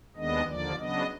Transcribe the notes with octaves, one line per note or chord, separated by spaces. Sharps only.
D#2 D#3 G#3 B3 D4 D#5
D#2 D3 F3 A#3 D5
C#3 F#3 B3 D4 D#5